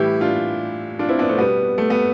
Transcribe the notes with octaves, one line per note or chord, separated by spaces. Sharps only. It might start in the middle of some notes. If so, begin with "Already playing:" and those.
Already playing: A2 E3 G3 E4 G4
D4 F4
D4 F4
C4 E4
B3 D4
A3 C4
B2 G3 B3
A3
B3